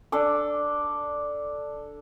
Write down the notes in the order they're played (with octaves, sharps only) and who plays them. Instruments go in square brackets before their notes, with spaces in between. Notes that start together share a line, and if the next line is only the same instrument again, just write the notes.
[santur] D4 A4 D6